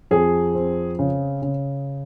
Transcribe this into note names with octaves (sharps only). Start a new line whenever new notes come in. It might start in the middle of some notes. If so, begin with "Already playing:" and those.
F2 G#4
C4
C#3
C#3